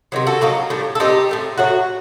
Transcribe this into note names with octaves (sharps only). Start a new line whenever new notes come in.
C3 D#3 F#3
F#4 A4
A2 F#3 A#3 D#4
A2 G3 D4
A4
A#2 G3 C4 D#4 G4
A2 A3 C4
A2 F#3 A3 F#4